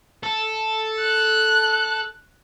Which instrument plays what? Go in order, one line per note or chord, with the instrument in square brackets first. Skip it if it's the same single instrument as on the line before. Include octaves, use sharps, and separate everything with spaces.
[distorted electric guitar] A4
[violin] F#6